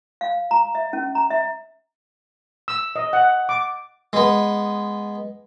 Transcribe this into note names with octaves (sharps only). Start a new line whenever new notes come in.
F5
A#5
E5
C#4
A#5
E5
E6
D#5
F#5
D6
G#3 B3